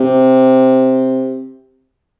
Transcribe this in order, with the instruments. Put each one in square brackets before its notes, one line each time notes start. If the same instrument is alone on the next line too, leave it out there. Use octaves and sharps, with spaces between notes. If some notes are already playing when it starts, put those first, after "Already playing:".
Already playing: [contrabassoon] C3